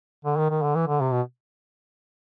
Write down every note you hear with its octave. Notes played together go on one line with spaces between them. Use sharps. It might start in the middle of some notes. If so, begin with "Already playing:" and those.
D3
D#3
D#3
D3
E3
D3
C3
B2